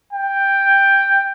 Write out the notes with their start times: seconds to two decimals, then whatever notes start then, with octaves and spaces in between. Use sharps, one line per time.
0.13 G5